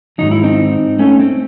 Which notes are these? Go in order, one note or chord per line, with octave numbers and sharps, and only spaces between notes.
G#2 D#3 F#3 D#4
E4
C4 D#4
A3 C#4
C4